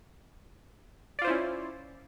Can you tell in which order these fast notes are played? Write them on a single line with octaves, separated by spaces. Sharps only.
D5 F4 C5 E4 C#4